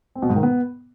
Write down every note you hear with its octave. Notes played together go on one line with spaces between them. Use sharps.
C4
B2
G#2
D#3
B3